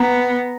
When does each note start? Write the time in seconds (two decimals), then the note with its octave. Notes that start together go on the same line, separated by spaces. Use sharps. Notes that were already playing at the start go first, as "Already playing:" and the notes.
Already playing: B3 A#5